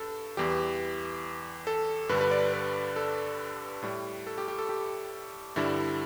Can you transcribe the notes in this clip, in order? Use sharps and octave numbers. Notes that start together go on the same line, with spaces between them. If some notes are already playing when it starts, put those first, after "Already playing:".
Already playing: G2 A4
E2 E3 G3 G4
A4
G2 D3 G3 B4
B4
D5
B4
A4
A2 G3
A4
G4
G4
A4
G4
G2 D3 G3 E4